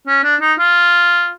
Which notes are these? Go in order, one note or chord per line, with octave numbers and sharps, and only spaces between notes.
C#4
D4
D#4
F4